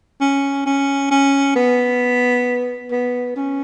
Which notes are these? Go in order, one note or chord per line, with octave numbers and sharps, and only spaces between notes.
C#4
C#4
C#4
B3
B3
C#4